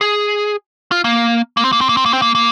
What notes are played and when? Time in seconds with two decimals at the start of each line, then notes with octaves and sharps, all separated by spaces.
0.01 G#4
0.91 F4
1.04 A#3
1.57 A#3
1.65 C4
1.72 A#3
1.81 C4
1.89 A#3
1.97 C4
2.06 A#3
2.13 C4
2.22 A#3
2.35 A#3